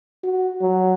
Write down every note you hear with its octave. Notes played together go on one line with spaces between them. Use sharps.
F#4
F#3